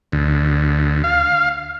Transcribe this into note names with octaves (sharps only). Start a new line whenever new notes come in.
D2
F5